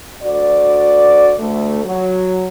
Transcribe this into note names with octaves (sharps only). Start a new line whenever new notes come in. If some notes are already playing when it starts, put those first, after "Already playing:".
D2 F#4 D5
D2 A3
F#3